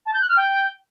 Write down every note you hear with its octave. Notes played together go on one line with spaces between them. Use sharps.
A5
G6
F#6
F6
G5